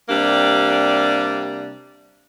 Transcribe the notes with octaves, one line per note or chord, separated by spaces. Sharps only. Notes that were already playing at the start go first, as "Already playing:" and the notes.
C3 G3 A#3 D4